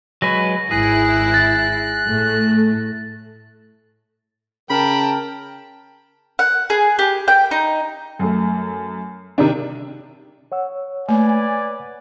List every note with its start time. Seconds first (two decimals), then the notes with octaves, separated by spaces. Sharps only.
0.22 F#3 G#3 B4 A#6
0.71 G#1 E4 G#4 F#6
1.34 A6
2.05 A2 A3
4.70 C#3 A#4 G5 A5 B5
6.39 F#5
6.70 G#4
6.99 G4
7.28 G5
7.51 D#4
8.19 F#2 A3
9.38 C3 D#3 D4
10.52 C#5 F#5 E6
11.09 A3 A#3 B4 D5 G#5